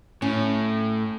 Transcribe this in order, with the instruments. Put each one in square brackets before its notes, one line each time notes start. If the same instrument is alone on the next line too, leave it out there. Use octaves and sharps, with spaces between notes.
[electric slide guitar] A2 [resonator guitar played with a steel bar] C#4